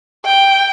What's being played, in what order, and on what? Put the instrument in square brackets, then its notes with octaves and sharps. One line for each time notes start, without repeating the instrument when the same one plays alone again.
[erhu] G5